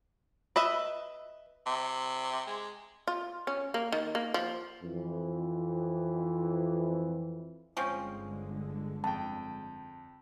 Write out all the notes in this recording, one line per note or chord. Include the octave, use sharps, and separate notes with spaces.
B4 D#5 E5
C3
G#3
F4
C#4
A#3
D#3
A#3
F3
F2 E3
G1 D3 F3 G#3 C4 C#4
F2 G5 A5